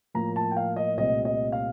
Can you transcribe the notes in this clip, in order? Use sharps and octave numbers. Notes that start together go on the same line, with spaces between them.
A2 F3 A#3 A#5
A5
G5
F5
D#5
C2 A#2 A3 C4 D#5
D#5
F5